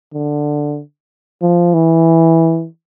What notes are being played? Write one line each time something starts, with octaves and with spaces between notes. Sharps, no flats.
D3
F3
E3